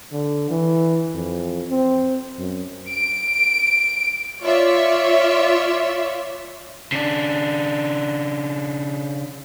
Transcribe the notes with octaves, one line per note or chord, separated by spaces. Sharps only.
D3
E3
F2
C4
F#2
D7
F4 C#5 D5 E5
C#3 D4